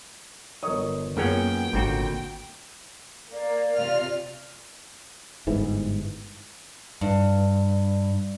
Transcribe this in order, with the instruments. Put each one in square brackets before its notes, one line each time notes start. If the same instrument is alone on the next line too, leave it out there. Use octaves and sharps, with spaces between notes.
[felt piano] G1 A#4 D#6 [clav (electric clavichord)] C#5 D#5
[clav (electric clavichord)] F#2 C#4 F#5 [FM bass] A#3 [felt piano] B3 F4 G#4 [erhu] G5
[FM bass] G#1 [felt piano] D2 [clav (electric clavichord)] A#2 C4 F#4
[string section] A#3 [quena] D5
[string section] C3 F4 F6
[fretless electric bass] G1 G#2 E3
[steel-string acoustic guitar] G2